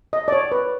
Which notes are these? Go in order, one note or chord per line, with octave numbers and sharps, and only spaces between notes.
D#5
D5
C#5
B4